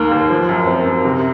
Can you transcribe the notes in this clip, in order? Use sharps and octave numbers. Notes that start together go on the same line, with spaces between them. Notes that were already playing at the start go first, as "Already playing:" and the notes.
Already playing: D#2 D#3 A#3
D#2
F3
F#2
C4
F#2
C3